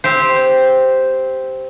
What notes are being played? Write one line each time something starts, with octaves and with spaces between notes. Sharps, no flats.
C4 G4 C5